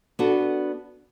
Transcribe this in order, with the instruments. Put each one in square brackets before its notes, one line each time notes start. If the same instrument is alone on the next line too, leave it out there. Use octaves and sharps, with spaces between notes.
[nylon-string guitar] B3 D4 F#4 A4